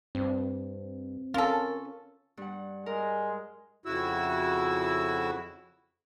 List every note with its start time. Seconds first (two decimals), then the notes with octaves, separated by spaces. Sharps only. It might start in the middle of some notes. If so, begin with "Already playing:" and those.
0.15 G2 C4
1.34 C#4 F4 A4 A#4
2.37 G2 F#5
2.86 G#3 A#4
3.86 F2 C#3 E4 F#4 E6